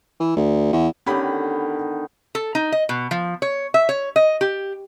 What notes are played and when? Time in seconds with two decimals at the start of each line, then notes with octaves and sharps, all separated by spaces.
0.20 E3
0.36 D2
0.72 E2
1.06 D3 D#3 B3 C#4 G4 B5
2.35 A4
2.55 D#4
2.72 D#5
2.89 B2
3.11 F3
3.42 C#5
3.74 E5
3.89 C#5
4.16 D#5
4.41 G4